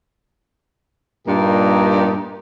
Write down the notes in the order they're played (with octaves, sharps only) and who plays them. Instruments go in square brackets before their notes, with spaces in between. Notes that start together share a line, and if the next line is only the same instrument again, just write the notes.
[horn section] G2 A#2 A#3 D#4 G4